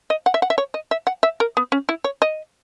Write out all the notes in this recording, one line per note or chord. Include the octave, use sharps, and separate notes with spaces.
D#5
F#5
E5
F#5
E5
C#5
D#5
E5
F#5
E5
A#4
B3
C#4
E4
C#5
D#5